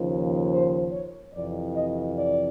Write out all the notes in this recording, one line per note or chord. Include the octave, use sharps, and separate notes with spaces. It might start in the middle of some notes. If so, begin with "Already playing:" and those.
Already playing: D#2 C#3 F3
C5
C#5
F2 C3 E3 D5
D#5
D5